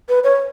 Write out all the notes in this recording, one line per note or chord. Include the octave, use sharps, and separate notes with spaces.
B4
C#5